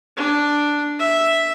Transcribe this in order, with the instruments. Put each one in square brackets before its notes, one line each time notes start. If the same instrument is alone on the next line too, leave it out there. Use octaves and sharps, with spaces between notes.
[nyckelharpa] D4
E5